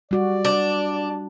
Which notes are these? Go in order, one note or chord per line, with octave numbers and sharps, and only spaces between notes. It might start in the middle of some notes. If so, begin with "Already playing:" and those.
G3 F#4 D5
D4